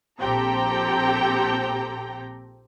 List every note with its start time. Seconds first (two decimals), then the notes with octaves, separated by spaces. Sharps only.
0.20 A#1 C4 G4 A4 G5 A#5